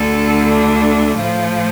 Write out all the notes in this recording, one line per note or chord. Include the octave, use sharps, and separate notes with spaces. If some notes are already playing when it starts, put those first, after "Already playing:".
Already playing: D2 D3 A3 A4
D4
A2 F3 A3 F4